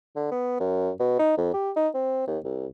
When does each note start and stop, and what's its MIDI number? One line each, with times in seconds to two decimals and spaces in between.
0.16 0.27 50
0.31 0.59 59
0.60 0.91 42
1.00 1.17 47
1.19 1.34 63
1.38 1.51 41
1.54 1.71 67
1.76 1.88 63
1.94 2.23 60
2.28 2.38 39
2.44 2.67 36